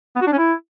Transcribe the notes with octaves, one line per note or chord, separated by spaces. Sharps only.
B3
F#4
D4
C#4
E4